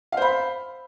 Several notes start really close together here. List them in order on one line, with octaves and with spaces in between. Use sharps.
F5 C5 B5